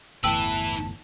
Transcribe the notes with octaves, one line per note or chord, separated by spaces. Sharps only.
G1 E2 A2 E4 B4 G5 A5 E6